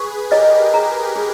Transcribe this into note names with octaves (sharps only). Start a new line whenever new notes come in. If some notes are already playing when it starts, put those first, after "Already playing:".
Already playing: G#4 B4 C#6
G4 A#4 D#5
A#5
G#4